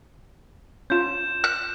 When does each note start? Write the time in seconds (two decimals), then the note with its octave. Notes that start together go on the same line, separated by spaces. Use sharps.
0.90 C#4 F4 G6 E7
1.44 F#6